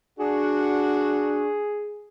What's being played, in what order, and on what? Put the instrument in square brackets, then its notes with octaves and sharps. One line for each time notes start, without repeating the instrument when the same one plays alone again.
[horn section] D4 F#4 [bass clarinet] G#4